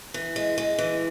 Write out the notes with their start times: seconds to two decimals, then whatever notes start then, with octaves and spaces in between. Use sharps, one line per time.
0.14 E3
0.36 G#3
0.58 G#3
0.78 E3